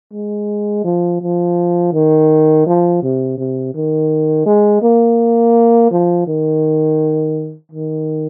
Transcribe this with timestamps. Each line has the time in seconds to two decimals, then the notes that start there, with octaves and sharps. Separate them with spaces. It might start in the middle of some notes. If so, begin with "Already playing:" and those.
0.13 G#3
0.84 F3
1.22 F3
1.93 D#3
2.66 F3
3.02 C3
3.38 C3
3.74 D#3
4.46 G#3
4.82 A#3
5.91 F3
6.27 D#3
7.72 D#3